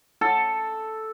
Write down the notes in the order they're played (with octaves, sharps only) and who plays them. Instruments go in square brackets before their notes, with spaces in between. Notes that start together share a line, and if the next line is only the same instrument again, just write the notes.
[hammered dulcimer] A4